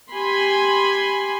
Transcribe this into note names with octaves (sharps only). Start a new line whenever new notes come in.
G4 G#5 B5 C6